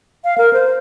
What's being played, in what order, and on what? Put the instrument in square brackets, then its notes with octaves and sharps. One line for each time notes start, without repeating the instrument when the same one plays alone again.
[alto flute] F5
A#4
C5